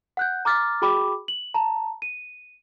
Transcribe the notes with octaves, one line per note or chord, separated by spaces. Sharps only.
F#5 F#6 G6
A#5 D6 F6 A6
F#4 G#4 G5 B5 D6
F#7
A5 A#5
D#7